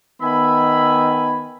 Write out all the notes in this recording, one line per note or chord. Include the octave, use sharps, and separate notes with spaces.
D#3 B3 E5 G#5 B5